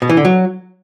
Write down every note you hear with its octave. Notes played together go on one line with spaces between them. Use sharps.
B2
E3
D3
F#3